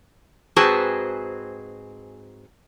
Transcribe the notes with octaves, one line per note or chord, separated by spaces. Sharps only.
G#2 C4 F#4 G#4 B4 A5